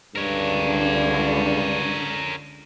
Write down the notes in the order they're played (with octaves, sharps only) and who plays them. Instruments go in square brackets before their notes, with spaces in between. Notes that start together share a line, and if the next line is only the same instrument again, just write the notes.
[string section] C#2 D3 [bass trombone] G2 [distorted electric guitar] A#4 C#5